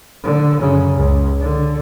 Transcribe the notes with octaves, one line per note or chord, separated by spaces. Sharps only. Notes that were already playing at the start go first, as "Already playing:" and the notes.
D3
F#2 C#3
C#2
D3